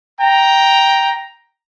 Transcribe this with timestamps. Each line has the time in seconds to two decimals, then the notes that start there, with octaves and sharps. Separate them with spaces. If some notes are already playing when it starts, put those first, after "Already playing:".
0.19 G5 A#5